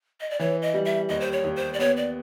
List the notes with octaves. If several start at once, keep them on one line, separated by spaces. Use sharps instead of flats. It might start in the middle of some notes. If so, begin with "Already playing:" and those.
D#5
D5
E3 C#5
D#5
G3
E5
D#2 D#5
C5
C#5
D#2
C5
D5
B3 C#5
D5